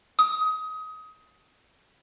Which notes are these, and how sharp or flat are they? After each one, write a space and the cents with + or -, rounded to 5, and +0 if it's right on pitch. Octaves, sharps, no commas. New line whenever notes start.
D#6 +25